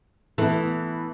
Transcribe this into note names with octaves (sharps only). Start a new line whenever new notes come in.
E3 A3 B3